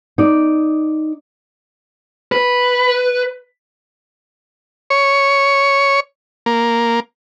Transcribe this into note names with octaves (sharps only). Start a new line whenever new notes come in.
D#4 D5
B4
C#5
A#3